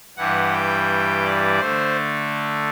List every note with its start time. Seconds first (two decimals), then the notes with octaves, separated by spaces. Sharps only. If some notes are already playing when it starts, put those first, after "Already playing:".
0.17 G2 E3 G3 F#5
0.53 G5
1.24 D5
1.60 D3 A3 C5